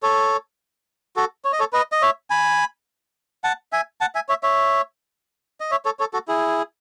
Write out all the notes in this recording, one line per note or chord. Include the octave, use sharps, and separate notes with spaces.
A4 C#5
F#4 A4
C#5
D#5
A4 C#5
B4 D#5
D#5
C#5 E5
G#5 B5
F#5 A5
E5 G#5
F#5 A5
E5 G#5
C#5 E5
C#5 E5
D#5
C#5 E5
A4 C#5
A4 C#5
F#4 A4
E4 G#4